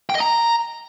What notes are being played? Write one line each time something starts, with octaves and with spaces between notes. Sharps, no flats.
G5
D#5
A#5